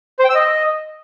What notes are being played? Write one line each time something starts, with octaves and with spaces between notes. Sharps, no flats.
C5
G5
E6
D#5